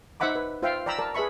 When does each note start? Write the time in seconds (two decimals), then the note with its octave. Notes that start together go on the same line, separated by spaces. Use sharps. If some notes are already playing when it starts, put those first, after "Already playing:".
0.20 D#4 C5 E5 F#5 B5 D6
0.35 B4
0.62 F4 C5 E5 F5 G5
0.86 D5 G5 A#5 B5 E6
0.99 A#4 D5 A5
1.14 G#4 B4 E5 B5 C#6